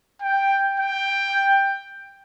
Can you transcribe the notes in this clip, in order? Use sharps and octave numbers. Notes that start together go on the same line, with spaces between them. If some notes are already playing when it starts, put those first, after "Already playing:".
G5
G5